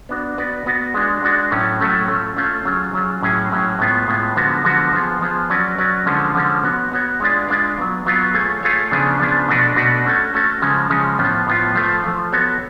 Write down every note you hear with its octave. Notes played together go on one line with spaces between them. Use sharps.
B3 D4 F#4
B3 F#4 B4 D5
B3 F#4 B4 D5
G#3 D4 F#4
G#3 D4 F#4
A2 F#3 A3 C#4
A2 F#3 A3 C#4
A3 C#4 F4
A3 C#4 F4
F#3 C#4 F4 G#4
F#3 C#4 F4 G#4
A2 F#3 C#4 G#4
A2 F#3 C#4 G#4
A2 G#3 B3 F4
A2 G#3 B3 F4
D3 F3 G#3 B3 F#4
D3 F3 G#3 B3 F#4
F3 B3 F4 G#4
F3 B3 F4 G#4
F#3 C#4 F#4 B4 D5
F#3 C#4 F#4 B4 D5
D3 F3 G#3 C#4
D3 F3 G#3 C#4
B3 F#4 C#5
B3 F#4 C#5
G#3 D4 F4 B4 D5
G#3 D4 F4 B4 D5
F#3 B3 F4
F#3 B3 F4
A3 F4 G#4 C#5
A3 F4 G#4 C#5
C#3 F3 B3 D4 G#4
C#3 F3 B3 D4 G#4
B2 A3 D4 F#4 B4
B2 A3 D4 F#4 B4
A3 C#4 F#4 A4
A3 C#4 F#4 A4
C#3 F3 G#3 C#4
C#3 F3 G#3 C#4
A2 F3 B3 F4
A2 F3 B3 F4
F3 A3 F4
F3 A3 F4
B3 F#4 A4 C#5